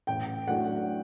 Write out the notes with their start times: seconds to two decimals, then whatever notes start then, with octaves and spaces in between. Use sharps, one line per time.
0.07 A1 G5
0.47 A2 F#3 A3 D4 F#5